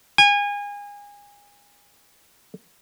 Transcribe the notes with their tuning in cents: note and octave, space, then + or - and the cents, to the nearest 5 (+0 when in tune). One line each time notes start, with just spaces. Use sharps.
G#5 -30